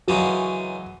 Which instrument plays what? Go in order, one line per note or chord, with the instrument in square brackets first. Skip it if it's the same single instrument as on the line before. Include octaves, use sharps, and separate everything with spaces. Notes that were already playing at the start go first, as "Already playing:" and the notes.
[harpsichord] F#2 C#3 E3 G#3 C#4 [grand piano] F#3